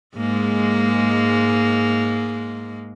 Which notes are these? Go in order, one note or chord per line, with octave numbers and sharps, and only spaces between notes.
G#2 G#3 A#3